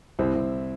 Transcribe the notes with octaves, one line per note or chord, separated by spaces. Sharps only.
C2 C4 E4
C2